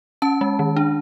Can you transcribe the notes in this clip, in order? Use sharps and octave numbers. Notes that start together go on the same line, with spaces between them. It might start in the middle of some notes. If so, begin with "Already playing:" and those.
C#4 A5
G#3
D#3
D4